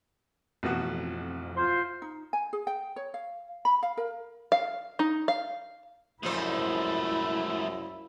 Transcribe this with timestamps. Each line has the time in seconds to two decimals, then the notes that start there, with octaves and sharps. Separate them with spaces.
0.63 A1 F2 B2 F#4
1.56 F4 C5 C6
2.02 D#4
2.33 G#5
2.53 G#4
2.67 G5
2.96 C#5
3.14 F5
3.65 B5
3.83 F5
3.97 A#4
4.52 F5
4.99 D#4
5.28 F5
6.23 F#2 A#2 F3 G#3 A3 E4 C5